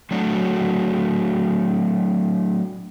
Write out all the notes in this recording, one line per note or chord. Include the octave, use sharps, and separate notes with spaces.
F#3 A3 D4 F#4